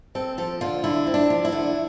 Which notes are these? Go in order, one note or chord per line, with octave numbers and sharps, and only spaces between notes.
C4 A4
F3 A4
D3 F4
D3 E4
C4
D4
F3
E4
D3